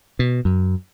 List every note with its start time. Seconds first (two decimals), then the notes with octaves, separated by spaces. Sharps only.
0.19 B2
0.45 F#2